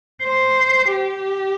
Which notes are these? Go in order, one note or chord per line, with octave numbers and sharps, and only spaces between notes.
C5
G4